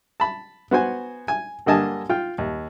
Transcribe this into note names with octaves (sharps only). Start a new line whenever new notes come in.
A5 B5
B3 F#4 C5 G#5
G#5
G2 D3 A#3 D#5 G#5 A5
F4 G5
D#2